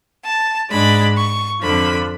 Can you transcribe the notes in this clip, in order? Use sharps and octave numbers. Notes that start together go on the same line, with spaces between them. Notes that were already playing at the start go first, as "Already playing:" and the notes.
A5
G#2 G#3 D4 B5
C#6
F2 D3 F3 B5